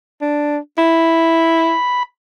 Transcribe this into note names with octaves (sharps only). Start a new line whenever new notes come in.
D4
E4 B5